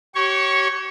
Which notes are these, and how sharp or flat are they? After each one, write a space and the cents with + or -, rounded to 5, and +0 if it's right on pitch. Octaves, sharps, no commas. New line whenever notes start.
G4 -40 C#5 -5 C#6 +0